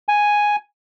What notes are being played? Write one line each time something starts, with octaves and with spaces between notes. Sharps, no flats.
G#5